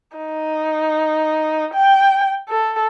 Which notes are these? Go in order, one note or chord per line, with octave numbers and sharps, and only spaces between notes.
D#4
G5
A4